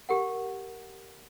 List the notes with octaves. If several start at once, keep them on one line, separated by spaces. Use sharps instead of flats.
G4 A#4 F#5